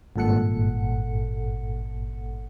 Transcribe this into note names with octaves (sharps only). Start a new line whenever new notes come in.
G#1 G2 A#2 A4 F#5 C#7